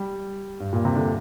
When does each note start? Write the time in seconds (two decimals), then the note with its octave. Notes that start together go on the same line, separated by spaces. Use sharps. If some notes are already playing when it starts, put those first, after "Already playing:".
Already playing: G3
0.60 G2
0.73 A#2
0.85 C3
0.96 D3